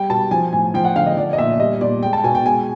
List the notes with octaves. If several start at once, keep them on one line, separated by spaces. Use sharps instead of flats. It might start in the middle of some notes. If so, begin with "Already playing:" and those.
Already playing: G3 G5
B2 A5
F3 G#5
A2 G#5
F3 G5
F#5
D3 F5
D#5
F3 D5
D#5
A#2 E5
G3 D#5
A#2 D5
G#3 G5
A5
B2 G#5
G5
G#3 G#5